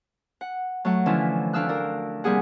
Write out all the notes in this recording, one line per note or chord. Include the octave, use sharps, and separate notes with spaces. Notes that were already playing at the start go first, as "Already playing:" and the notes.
F#5
F#3 A3 F#5
D3 E3 F3 C#4 D4 E4
D2 D4 F5 E6 F#6
D4 A#4
C3 G3 A#3 G#4 F#5